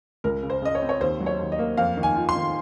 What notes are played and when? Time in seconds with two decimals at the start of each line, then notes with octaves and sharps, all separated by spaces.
0.24 C#2 A#4
0.43 C#3
0.50 C5
0.62 C#3 D#5
0.75 C#5
0.82 C4
0.89 C#5
1.01 D#2 C5
1.20 F#3
1.26 C#5
1.39 D#2
1.52 D#5
1.59 A#3
1.77 F2 F5
1.97 D#3
2.03 G#5
2.16 F4
2.29 C6
2.35 D#3